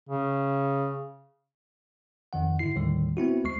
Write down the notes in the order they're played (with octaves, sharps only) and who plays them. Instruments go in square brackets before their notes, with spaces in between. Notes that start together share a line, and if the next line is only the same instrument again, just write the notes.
[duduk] C#3
[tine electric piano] F2 D#3 F#5
G#2 D3 E4 C7
D#2 A2 D3 D#3 G3
B3 C4 E4 F#4
D2 G#3 C#6 C7